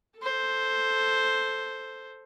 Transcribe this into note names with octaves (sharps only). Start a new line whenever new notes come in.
A4 C5